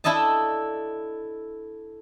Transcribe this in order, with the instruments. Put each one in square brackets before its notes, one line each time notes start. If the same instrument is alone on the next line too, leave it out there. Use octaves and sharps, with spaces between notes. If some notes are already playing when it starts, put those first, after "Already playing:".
[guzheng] D4 E4 A4 D#5 A5